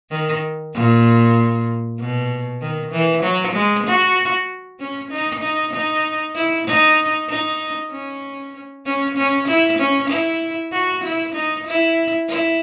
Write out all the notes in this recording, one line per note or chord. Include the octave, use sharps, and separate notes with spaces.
D#3
A#2
B2
D#3
E3
F#3
G#3
F#4
C#4
D#4
D#4
D#4
E4
D#4
D#4
C#4
C#4
C#4
E4
C#4
E4
F#4
E4
D#4
E4
E4